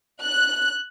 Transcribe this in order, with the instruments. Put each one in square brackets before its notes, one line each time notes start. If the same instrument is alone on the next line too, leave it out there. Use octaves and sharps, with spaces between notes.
[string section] F#6